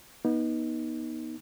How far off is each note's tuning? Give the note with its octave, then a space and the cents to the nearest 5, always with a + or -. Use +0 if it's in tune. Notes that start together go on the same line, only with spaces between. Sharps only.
B3 -30 D#4 +10